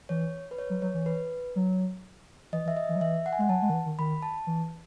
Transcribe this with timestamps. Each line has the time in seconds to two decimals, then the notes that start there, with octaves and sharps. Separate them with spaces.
0.09 E3 C#5
0.51 B4
0.58 C#5
0.70 F#3
0.82 F#3 C#5
0.94 E3
1.06 B4
1.56 F#3
2.52 E3 D#5
2.65 E3
2.68 E5
2.77 D#5
2.89 E3
2.96 F#3
3.01 E3 E5
3.26 F#5
3.33 G#5
3.39 G#3 F#5
3.49 F#3 A5
3.62 G#3
3.70 D#3
3.73 E3
3.86 D#3
3.99 D#3 B5
4.22 A5
4.47 E3